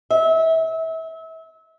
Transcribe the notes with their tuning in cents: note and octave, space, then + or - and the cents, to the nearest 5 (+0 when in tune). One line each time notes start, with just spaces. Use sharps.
E5 -30